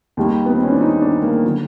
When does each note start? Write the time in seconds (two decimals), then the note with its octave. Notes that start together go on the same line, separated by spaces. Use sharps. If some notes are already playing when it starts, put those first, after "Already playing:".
0.17 D#2 D#3 G3
0.46 B3
0.54 C4
0.63 C#4
0.72 D4
0.81 D#4
1.01 D4
1.22 A#3
1.44 D3 F#3